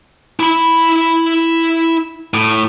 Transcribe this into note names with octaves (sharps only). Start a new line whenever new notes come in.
E4 B5
A2